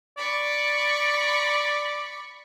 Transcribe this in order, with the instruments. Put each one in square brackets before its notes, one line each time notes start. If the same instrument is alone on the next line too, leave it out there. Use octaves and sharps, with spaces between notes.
[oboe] D5 [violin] B5 C#6